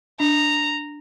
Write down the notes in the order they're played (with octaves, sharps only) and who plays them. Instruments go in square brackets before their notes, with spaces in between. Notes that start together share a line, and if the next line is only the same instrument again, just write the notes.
[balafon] D4 [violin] A#5